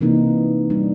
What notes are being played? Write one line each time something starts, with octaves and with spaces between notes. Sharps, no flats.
C3 E3 A#3 D#4
G3 D4